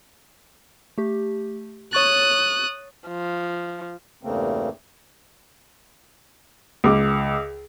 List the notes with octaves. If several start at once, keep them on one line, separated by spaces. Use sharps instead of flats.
A3 G4
C#5 C#6 D#6 F#6 A6
F3
E2 G2 C#3 A3 A#3 C4
C#2 D6